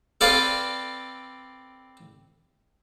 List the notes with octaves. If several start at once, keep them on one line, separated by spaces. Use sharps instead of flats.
C4 A4 B4 D5 F5